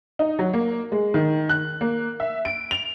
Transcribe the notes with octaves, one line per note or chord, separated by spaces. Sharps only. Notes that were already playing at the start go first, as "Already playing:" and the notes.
D#4
F#3
A#3
G#3
D#3
F#6
A#3
E5
D7
F7